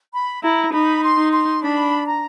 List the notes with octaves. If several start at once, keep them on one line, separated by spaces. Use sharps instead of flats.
B5
E4 A#5
D#4 B5
C6
D#4
C6
D4 B5
A#5